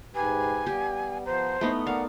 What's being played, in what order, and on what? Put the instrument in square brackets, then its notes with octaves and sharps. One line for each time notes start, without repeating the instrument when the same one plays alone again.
[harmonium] G#2 G4 B4 [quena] G#5
[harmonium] G3 B3 [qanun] G4
[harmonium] F3 B3 A#5 [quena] C5
[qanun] A3 B3 D#4 [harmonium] E4
[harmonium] A#4 D5 [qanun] F5 [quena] F#5